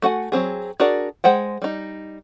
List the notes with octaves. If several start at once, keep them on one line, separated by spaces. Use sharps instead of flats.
A3 F#4 F#5 G#5
F#3 C4 G#4
D4 F#4 G#4 A#4 D5
G#3 C5 F#5 G5
G3 D#4